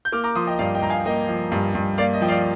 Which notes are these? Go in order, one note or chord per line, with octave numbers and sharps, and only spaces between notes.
G6
A#3 D6 F6
A#5 D6
F3 C6 D#6
D#5 G5
G2 D5 F5
D#5 G5
G2 A#5
F5 G#5
A#3 D#5 G5
F3
G2
G2
A#3 D5 F5
D#5
F3 G5
D5 F5